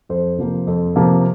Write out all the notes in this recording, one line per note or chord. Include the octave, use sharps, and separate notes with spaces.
F2 C5
C3 F3 A#3
F2
C3 F3 A#3